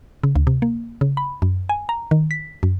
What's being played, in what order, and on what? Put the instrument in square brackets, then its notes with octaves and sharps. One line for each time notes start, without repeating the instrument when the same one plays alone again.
[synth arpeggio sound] C#3
D2
C3
A#3
C#3
B5
F#2
G#5
A#5
D#3
B6
F#2